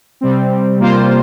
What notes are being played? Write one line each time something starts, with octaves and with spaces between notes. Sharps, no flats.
C3 G3 C4
C3 G3 A#3 F4 C5